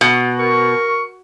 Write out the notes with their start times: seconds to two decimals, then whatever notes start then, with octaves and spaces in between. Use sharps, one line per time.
0.01 B2
0.39 A#4 C#6